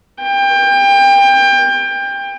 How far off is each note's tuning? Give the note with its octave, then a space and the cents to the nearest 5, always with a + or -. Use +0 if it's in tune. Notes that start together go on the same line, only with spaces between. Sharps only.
G5 +25